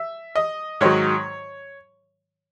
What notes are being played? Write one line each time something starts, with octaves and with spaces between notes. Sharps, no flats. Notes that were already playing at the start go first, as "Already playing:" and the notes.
Already playing: E5
D#5
G#2 D#3 F#3 C#5